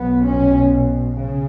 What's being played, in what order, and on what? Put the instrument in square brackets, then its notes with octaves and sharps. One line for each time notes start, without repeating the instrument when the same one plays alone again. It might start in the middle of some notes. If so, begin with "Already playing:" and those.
Already playing: [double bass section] B1 B2 B3
C#4
C#3